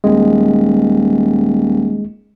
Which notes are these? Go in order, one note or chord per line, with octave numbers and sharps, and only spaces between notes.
D#1 G#3